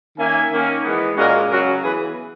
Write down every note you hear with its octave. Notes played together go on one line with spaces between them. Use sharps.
D#3 A#3 C#4 E5 G#5
D#3 A#3 C#4
E3 G#3 B3
A#2 G#3 C#4 F#4 A#4
C#3 F#3 C#4 F#4 A#4
E3 B3 G#4 B4